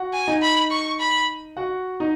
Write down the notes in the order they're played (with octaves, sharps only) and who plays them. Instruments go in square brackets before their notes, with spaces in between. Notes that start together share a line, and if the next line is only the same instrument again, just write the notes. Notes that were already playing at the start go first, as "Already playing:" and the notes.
Already playing: [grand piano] F#4 F#5
[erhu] G#5
[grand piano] D#4 D#5
[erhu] B5
C#6
B5
[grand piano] F#4 F#5
D#4 D#5